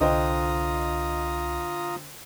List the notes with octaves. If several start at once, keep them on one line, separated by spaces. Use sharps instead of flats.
C2 D3 F4 C5 D#5 G5 A#5 D#6